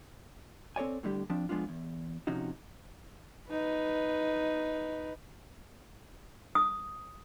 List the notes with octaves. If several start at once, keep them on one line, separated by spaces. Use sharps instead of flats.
C4 A4 C#5 D5 G#5
A2 D3 G3 G4
F3 C4 D4
F3 G#3 B3 D4 F4
E2
C3 F3 C#4 D#4 F#4
D#4 B4
D#6